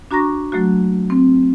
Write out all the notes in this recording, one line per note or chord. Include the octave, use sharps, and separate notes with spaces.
D4 F#4 A#5 C#6 A#6
F#3 A3 A#3 F#4
C4